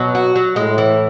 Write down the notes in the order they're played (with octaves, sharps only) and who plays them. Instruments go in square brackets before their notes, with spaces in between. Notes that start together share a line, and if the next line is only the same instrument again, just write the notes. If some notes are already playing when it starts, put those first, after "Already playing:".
Already playing: [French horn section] B2 [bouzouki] F#3
[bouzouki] F#4
F#3
[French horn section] A2 [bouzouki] G#3
[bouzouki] E3